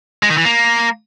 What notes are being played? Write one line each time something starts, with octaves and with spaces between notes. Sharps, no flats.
G#3
D#3
E3
A#3